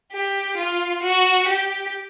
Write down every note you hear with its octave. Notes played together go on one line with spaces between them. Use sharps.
G4
F4
F#4
G4